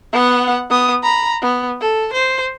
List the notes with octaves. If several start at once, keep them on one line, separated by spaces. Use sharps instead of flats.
B3 F#5
B3 D#6
A#5 B5
B3
A4
C5